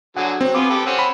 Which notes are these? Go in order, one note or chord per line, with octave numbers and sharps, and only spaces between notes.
D3 F#3 G#4 F#5
F#3 C4
B3 F4 G#4 D6
G4 A4 B4
C4 C#4 F#5
B5